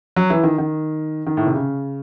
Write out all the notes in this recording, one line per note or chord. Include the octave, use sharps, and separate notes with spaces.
F#3
E3
D#3
D#3
D#3
A2
C3
C#3